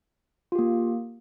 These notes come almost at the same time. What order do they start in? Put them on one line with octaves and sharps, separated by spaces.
F4 G4 A#3